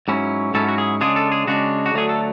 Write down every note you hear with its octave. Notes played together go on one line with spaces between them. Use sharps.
G#2 F#3 C#4 E4
G#2 F#3 C#4 E4 A4
F#4
G#4
C#3 G#3 D4 G#4
A4
G#4
C#3 G#3 D4 F#4
F#4
D2 D3 F#3 A3 G#4
A4